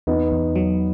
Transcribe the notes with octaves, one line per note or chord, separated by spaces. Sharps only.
E2 B3 D#4
E2
F#3